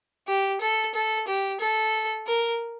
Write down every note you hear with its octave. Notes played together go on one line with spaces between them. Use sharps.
G4
A4
A4
G4
A4
A#4